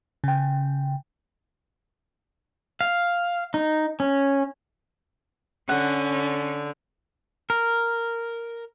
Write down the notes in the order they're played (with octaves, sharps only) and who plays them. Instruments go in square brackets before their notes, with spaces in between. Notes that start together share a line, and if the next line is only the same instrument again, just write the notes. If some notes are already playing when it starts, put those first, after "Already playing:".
[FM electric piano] C#3 G5
[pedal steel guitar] F5
D#4
C#4
[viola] D3 [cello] C#4 [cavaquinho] F#5
[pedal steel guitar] A#4